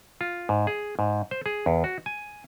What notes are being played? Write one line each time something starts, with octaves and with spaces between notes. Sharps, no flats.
F4
G#2
G#4
G#2
C5
G#4
E2
F#4
G#5